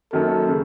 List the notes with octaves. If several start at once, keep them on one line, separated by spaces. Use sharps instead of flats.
F#2 D#3 F#3 A#3 C#4 A4
C#3